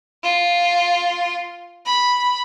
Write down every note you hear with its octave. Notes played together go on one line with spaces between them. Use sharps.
F4
B5